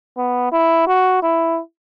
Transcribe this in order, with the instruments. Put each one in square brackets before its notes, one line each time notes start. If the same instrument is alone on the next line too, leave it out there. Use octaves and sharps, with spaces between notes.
[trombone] B3
E4
F#4
E4